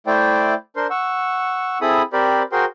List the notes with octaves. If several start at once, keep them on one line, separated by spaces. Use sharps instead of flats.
A3 E4 C5 D5 G5
D4 A#4 C5 C6
F#5 C#6 E6
C4 E4 G#4 A4 B5 D#6
C4 G4 A#4 C5 D5 B5
F#4 G#4 A#4 C5 G5 C6